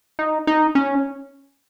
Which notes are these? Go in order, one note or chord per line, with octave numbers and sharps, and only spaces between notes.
D#4
D#4
C#4